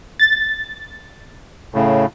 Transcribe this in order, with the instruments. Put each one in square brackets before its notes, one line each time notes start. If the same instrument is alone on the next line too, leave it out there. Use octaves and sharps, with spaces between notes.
[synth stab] A6
[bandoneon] A2 C#3